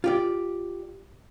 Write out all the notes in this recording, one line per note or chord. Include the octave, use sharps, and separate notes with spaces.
F4 G4 D5